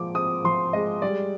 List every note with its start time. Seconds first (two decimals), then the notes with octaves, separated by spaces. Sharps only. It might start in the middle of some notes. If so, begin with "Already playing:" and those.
Already playing: A#2 F3 G#3 D6
0.15 C4 D#6
0.44 F3 C6
0.73 G#3 D#5
1.02 G3 D5